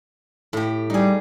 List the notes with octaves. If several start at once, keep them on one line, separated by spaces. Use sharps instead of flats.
A2 G4
G3 D#4 G#4